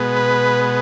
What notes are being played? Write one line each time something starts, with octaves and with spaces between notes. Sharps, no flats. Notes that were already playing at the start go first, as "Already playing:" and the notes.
Already playing: B2 G#3 B3
B4